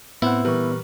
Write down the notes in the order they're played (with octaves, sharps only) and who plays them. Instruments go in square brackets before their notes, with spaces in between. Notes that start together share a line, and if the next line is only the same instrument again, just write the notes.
[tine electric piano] A2 [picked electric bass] B3 [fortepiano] C4 F#5 [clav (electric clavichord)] E4
[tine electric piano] A#2 E3 C#6 [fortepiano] G3 A#4 B4